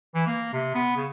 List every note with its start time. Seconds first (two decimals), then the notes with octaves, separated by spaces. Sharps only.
0.14 E3
0.27 A#3
0.53 C3
0.75 B3
0.96 C#3